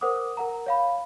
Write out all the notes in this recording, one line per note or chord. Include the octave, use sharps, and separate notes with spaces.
A#4 C5 F#5 D6 D#6
A#4 F#5 A#5
C#5 F5 B5